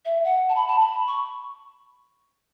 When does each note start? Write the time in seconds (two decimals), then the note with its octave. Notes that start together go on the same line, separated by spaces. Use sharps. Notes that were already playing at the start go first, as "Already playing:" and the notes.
0.05 E5
0.24 F#5
0.49 A5
0.55 B5
0.68 A5
0.80 B5
1.07 C#6